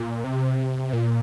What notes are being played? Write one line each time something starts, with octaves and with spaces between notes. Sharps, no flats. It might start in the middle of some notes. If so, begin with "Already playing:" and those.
Already playing: A#2
C3
A#2